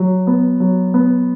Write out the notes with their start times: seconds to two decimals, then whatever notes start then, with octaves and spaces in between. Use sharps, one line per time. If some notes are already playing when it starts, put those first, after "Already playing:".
Already playing: F#3
0.27 B3
0.60 F#3
0.94 B3